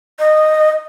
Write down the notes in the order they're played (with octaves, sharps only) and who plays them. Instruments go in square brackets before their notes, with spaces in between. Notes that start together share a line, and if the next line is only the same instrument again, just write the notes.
[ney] D#5